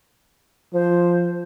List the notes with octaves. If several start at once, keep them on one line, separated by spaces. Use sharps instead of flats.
F3 C5